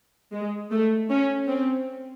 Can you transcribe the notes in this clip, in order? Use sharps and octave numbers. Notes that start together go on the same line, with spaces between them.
G#3
A3
C#4
C4